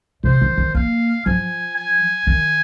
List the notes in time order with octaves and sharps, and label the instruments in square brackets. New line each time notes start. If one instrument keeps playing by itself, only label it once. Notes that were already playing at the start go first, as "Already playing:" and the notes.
[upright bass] C3 [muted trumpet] C5
[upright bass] D#3
D#3
[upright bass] A#3 [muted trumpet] F5
[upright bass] F3 [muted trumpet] G#5
[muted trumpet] G#5
[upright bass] D#3